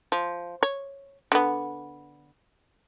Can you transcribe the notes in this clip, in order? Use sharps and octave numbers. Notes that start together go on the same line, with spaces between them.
F3
C#5
D3 B3